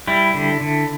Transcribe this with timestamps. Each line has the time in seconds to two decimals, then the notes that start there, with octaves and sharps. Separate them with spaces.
0.08 G3 E4
0.34 D3
0.61 D3